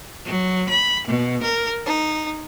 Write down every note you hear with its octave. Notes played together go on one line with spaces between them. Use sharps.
F#3
B5
B2
A#4
D#4